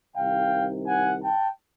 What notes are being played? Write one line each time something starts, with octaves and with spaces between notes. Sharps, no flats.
C2 C3 D#3 F5 G5
F#5 G#5
G5 A5